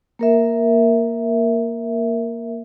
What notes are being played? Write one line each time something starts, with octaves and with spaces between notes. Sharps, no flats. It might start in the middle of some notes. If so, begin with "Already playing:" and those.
A#3 A#4 E5